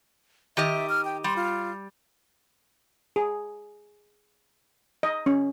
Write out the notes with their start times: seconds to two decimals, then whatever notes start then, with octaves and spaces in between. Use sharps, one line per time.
0.57 D#3 G4 D#5 E5
0.89 F6
1.05 G5
1.24 G3 C6
1.36 F4
3.16 G#4
5.03 D#5
5.26 C#4